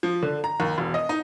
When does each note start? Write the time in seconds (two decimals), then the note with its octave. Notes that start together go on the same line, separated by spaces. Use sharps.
0.03 F3
0.23 D3
0.44 A#5
0.60 D#2
0.78 E1
0.94 D#5
1.09 D#4